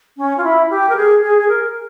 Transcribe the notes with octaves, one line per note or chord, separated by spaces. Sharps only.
C#4
F4
E4
G4
A#4
G#4
G#4
G#4
A#4